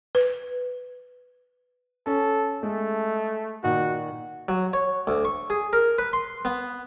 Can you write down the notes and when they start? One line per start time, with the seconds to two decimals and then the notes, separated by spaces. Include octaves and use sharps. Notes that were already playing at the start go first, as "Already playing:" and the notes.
0.15 B4
2.07 C#4 A4
2.63 G#3 A3
3.64 A#2 D#3 F#4
4.48 F#3
4.73 C#5
5.07 D2
5.25 C#6
5.50 G#4
5.73 A#4
5.98 B4
6.13 C6
6.45 B3